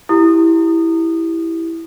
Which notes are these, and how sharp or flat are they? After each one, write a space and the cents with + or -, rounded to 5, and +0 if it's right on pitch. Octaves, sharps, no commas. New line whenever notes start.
E4 +0 G4 -5 D#6 -20